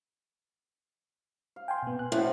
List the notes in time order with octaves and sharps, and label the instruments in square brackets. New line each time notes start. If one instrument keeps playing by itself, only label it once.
[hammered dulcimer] F5
[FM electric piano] G5 G#5 C6
B2 B3
F#6
[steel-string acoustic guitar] A2 [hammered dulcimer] F3 C#4 F#4